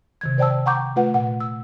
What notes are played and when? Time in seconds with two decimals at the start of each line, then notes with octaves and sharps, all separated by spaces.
0.21 C3 D#3 G#6
0.38 C5 D5 G5 A5 E6
0.66 F#5 G5 A#5 C#6 D6 G6
0.96 A3 F4 B4 F#5
1.14 A#2 F#5
1.40 E6